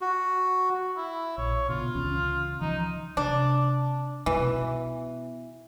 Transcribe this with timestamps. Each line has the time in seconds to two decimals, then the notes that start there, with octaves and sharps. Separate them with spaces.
0.01 F#4
0.97 E4
1.38 A#1 C#5
1.69 B2 D3 F4
1.95 C#2 E3 C#4
2.61 E3 F3 D#4
3.17 C3 D4
4.26 B2 E3